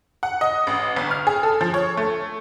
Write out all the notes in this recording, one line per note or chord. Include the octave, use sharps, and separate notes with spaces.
F#5
D#5
A1
G1
F6
G#4
A4
F3
C#5
A3